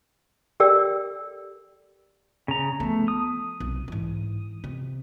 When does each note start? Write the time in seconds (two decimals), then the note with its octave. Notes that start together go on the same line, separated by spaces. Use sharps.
0.60 G4 A4 A#4 D5 G5 E6
2.48 C#3 A#5
2.80 F3 A3 B3
3.08 D#6
3.60 B1 C3
3.88 G#2 E3
4.64 C3